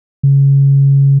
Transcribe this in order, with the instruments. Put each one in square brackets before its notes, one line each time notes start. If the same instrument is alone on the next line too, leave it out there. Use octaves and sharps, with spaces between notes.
[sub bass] C#3